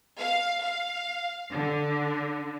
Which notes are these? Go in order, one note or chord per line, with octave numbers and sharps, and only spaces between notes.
F5
F5
D3